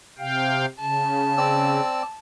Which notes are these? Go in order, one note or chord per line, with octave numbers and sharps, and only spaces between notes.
C3 F5 G5
C#3 A5
C4 D5 E6